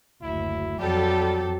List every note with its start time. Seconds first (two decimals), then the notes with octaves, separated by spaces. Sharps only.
0.22 F#1 D2 E4
0.79 F2 F#3 G3 G4 A4